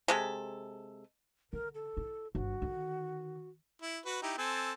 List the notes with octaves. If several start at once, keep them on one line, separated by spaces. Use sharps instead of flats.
C3 G#3 A4
D3 A#4
A4
E4
G1 F#4
D3 D#3
E4
F#4 B4
D#4 E4 G4
C4 A4 G#5